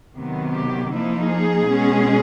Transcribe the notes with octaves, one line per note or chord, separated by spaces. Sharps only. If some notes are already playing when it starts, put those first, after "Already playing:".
C3 D#3 F#3 B3
G4
F3 A#3 D#4 E4
G#4
B2 G#3 C#4